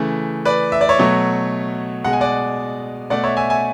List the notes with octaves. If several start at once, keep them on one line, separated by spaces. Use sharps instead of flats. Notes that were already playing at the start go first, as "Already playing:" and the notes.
Already playing: C#3 E3 A3
B4 D5
E5
D5
C#5 E5
B2 F#3 A3
B2 G#3 F#5
G#5
D5 F#5
B2 A3 D5 F#5
C#5 E5
E5 G#5
E5 G#5